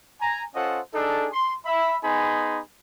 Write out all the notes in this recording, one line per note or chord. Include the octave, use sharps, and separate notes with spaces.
G#5 A#5
C#4 F4 A4 C5 D#5 F#5
D4 D#4 G#4 A4
C6
E5 B5
B3 D#4 G#4 G#5 B5 C6